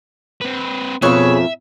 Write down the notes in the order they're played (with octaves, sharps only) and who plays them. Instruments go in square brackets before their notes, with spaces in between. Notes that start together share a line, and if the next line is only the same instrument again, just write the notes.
[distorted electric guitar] C4 B4
[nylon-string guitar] F2 F5 [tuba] B2 [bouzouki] G#4 B4 C#5 [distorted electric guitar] E5